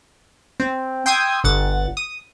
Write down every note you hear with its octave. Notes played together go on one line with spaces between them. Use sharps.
C4
G5 C6 D#6 E6 G#6
G1 F#5 A6
D#6